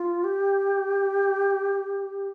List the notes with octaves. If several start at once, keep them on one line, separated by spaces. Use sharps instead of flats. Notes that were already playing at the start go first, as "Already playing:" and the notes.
Already playing: F4
G4